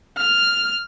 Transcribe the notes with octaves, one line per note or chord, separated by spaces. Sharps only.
F6